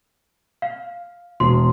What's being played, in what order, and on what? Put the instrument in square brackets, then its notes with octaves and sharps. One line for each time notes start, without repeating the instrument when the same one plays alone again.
[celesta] F5
[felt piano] E1 [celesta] C6